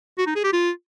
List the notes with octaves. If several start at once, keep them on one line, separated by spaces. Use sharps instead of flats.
F#4
D#4
G#4
G4
F4